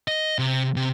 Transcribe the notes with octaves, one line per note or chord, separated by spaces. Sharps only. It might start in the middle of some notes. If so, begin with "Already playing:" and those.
D#5
C3
C3